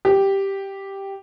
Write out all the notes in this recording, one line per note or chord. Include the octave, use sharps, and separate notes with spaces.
G4